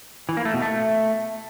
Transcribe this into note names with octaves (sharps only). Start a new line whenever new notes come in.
E3
A#3
A3
B2
A3